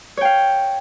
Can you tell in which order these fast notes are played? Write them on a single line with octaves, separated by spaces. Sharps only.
C#5 G5 F5